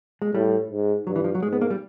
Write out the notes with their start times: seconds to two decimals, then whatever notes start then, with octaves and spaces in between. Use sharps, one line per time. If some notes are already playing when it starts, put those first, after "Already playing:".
0.22 G#3
0.34 A2 G3
0.70 G#2
1.07 G2 F#3
1.16 E3
1.24 F3
1.35 F#3
1.43 G#2 G#3
1.53 B3
1.61 A#3
1.70 G3